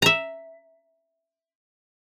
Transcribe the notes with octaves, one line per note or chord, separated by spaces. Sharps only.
E5 A#5